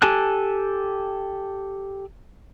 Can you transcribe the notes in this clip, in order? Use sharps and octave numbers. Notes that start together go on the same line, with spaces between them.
G4 A4 G#5 A5 F#6